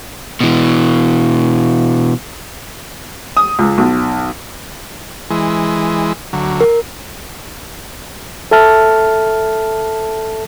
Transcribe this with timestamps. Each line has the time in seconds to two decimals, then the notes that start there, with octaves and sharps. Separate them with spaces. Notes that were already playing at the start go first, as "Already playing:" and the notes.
0.41 B2 E3
3.37 D#6
3.59 C#2
3.78 B1
5.30 E3 G#3
6.33 D2 F#3
6.61 A#4
8.51 A4 E5 A5 F6